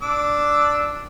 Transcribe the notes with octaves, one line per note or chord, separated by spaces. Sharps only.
D4 D6 E6